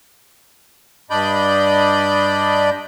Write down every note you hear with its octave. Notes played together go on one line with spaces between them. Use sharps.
G2 D4 D5 D#5 B5 G6